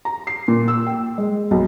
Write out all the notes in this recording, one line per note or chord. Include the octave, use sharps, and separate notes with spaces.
A#5
C7
A#2
E6
G5
G#3
B1